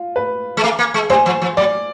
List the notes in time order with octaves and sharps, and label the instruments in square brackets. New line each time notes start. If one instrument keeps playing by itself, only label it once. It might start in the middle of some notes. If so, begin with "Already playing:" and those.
Already playing: [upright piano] F4
B4
[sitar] G#3
A3
A#3
G#3
[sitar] G3 [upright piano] C5
[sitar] F3
F3
[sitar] F#3 [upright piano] D5